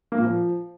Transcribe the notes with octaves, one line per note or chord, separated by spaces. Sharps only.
A#3
A#2
F3